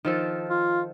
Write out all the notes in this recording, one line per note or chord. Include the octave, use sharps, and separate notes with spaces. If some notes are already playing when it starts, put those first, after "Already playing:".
D#3 F3 A4
F4